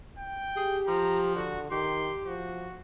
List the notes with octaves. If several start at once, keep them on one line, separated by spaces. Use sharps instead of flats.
G5
G4 G#4
F3 A#5
D3 F#4
D#3 G4 C6
F3 F#4